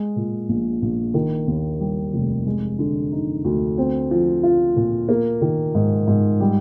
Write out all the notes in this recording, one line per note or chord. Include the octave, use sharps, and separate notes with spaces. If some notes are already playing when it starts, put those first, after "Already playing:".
Already playing: G#3
A#2
A#1
A#1
D#3
D#2
G3
F1
G#3
D3
D#4
D2
C4
F3
F4
A#2
A#3
D#3
G#2
G#2
G3